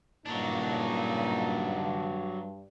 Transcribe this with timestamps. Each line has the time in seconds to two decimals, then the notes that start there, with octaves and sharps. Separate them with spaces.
0.26 G2 A#2 C#3 F#3 D4 D#4